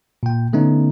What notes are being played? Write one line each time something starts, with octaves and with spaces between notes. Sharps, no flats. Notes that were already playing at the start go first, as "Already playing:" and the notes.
A#2 G5
D3 A3 B3 C#4 D#4